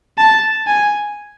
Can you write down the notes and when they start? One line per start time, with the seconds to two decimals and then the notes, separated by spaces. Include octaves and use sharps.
0.18 A5
0.67 G#5